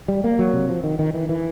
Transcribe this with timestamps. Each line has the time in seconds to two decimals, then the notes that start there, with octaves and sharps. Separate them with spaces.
0.08 G3
0.24 A#3
0.39 F#3
0.53 C3
0.69 F3
0.84 D#3
0.99 D#3
1.14 E3
1.29 E3